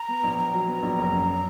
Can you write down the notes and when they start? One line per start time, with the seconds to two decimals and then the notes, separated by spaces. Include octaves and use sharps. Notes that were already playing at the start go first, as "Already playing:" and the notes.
Already playing: A#5
0.09 B3
0.23 A#1
0.38 A#1 A#5
0.54 F#3
0.67 B3
0.83 A#1
0.99 F#1
1.12 F#2